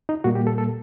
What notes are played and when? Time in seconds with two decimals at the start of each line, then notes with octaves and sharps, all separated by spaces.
0.09 D#4
0.24 A#2 G3 A#3 F#4
0.35 G4
0.47 A4
0.58 A4